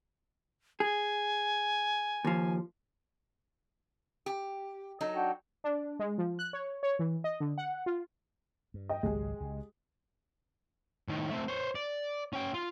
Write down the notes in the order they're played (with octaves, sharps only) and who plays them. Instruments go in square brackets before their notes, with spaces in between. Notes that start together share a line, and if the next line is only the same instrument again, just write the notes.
[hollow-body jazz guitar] G#4 [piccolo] G#5
[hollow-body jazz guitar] D#2 F3
[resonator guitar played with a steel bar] G4
F#3 D#4 A4
[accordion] D4 F#4 G5
[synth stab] D4
G#3
F3
F#6
C#5
C#5
E3
D#5
D3
F#5
F4
[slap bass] G2
[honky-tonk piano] D#5 G5
[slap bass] G#1 C#2 F#3 [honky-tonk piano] G#3 G4 G#4
[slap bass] C#2
[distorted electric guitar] A2 D#3
A3 C4
C5 C#5
D5
C#4 G5
F4